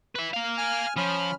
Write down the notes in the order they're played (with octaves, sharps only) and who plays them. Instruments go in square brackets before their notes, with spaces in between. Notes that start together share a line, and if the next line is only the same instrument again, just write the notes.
[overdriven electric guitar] B4 E5
A#4 F5
[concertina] G#5 F6
[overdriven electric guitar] F3 [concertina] C#4 B5 F6